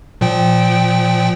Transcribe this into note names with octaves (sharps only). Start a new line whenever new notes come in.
A#2 F3 G5